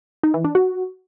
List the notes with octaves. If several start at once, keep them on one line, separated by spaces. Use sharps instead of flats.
D#4
E3
D4
F#4